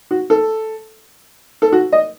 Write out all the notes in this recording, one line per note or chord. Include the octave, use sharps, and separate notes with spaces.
F#4
A4
A4
F#4
D#5